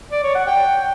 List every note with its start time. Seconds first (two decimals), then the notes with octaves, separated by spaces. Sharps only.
0.11 D5
0.23 C#5
0.35 F#5
0.47 G5